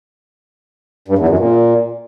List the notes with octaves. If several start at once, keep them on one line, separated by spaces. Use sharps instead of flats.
G2
E2
F#2
A#2